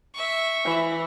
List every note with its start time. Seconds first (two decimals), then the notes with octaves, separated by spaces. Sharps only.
0.15 E5 C#6
0.65 E3